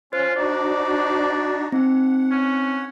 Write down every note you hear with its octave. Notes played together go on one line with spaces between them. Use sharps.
C#4 F4 C5
D4 D#4 F#4 D5
C4 D#4 F#5
C#4